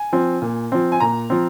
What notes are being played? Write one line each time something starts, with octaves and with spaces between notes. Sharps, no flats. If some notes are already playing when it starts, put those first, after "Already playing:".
Already playing: G#5
F3 C4
A#2
F3 C4
G#5
A#2 A#5
F3 C4